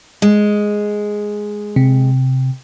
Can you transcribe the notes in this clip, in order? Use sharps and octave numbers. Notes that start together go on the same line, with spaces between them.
G#3
C3